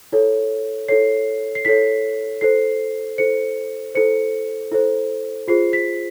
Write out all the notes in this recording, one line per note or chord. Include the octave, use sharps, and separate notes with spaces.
E4 A4 C#5
E4 A4 C#5 C7
C7
E4 A4 C#5 B6
E4 A4 C5 C7
E4 A4 C5 C#7
E4 A4 C5 C#7
E4 A4 C5
F4 G#4 C5 C7
B6